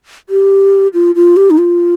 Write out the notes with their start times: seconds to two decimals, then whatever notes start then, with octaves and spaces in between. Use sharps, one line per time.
0.29 G4
0.94 F4
1.15 F4
1.37 G4
1.50 D#4
1.58 F4